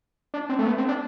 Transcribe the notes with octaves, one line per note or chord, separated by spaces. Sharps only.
D4
C4
A3
B3
C4
D4